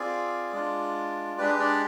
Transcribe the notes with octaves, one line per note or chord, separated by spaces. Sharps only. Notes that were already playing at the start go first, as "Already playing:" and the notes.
Already playing: C4 F4 G#4 D5
G#3 D4 F4
G#3 D4 G4 B4
D4 D5